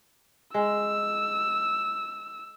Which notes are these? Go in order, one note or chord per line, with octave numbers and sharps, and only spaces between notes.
G#3 E6